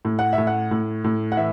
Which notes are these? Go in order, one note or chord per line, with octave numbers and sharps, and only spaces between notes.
A2
F#5
E5
A2
F#5
A2
A2
F#5
E3 E5